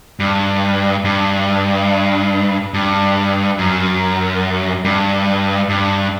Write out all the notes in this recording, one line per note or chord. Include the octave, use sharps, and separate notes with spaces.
G2
G2
G2
F#2
G2
G2